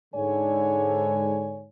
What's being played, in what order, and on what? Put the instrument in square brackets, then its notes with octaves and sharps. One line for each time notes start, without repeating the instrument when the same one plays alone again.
[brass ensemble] G#2 D3 C#5 G#5